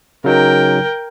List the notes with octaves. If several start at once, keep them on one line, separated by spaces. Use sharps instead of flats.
C#3 F#3 D#4 A#4 G5